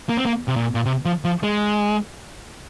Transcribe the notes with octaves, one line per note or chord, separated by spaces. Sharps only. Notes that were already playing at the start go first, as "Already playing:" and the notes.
A#3
C4
A#3
C3
A#2
A#2
C3
F3
F3
G#3